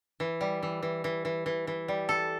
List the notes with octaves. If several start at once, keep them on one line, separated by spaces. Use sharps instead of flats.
E3
G3
E3
E3
E3
E3
E3
E3
G3
A4